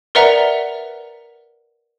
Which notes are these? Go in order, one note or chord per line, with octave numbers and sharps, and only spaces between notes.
A#4 B4 D5 E5 F#5 A#5